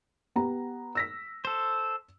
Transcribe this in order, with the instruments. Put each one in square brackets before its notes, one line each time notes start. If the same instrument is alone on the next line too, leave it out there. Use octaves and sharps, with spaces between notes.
[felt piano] B3 G4 A#5
E6 A#6 B6
[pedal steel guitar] A4 C5